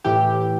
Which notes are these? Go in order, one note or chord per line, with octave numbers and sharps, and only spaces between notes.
A2 E3 G4